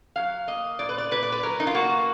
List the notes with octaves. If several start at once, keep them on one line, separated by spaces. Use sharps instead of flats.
F#3 F5
A#3 D#5
A#2 D5
B4
D5
A#2 B4
D5
B4
F#3 A#4
D#4
F4
A#3 F#4